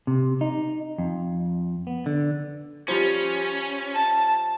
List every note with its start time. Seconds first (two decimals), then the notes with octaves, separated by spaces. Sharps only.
0.07 C3
0.41 D#4
0.98 F2
1.87 B3
2.06 D3
2.88 F3 G3 C#4
3.95 A5